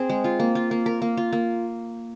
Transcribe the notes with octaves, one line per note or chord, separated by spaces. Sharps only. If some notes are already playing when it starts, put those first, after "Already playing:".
Already playing: C4 G#4
G#3
F4
A#3
F4
A#3
A#4
A#3
F4
A#3